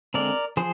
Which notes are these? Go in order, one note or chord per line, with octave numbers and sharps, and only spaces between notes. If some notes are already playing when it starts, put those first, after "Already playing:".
D3 G#3 C4 A#4 D5
F3 G#4 C5